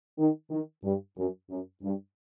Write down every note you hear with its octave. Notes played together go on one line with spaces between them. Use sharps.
D#3
D#3
G2
F#2
F#2
G2